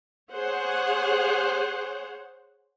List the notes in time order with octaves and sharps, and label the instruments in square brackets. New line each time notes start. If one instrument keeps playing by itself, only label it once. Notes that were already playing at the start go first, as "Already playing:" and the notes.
[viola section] G#4 C5 C#5 F#5